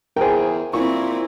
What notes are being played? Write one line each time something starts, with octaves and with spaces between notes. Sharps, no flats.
E2 G#4 A#4 C5 G5
A#2 C4 E4 C#6